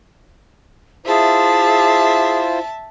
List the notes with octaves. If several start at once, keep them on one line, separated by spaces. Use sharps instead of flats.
E4 F4 G#4 C5 E5 A5